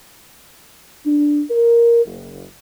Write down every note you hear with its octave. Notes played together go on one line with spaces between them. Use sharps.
D4
A#4
F#1